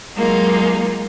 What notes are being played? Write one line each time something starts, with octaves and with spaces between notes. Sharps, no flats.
F#3 G#3 A#3 D#4 F4